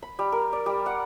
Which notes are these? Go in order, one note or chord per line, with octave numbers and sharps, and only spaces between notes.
B5
G3
A#4
D5
G3
F#5